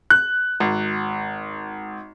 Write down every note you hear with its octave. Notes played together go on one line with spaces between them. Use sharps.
F#6
G#1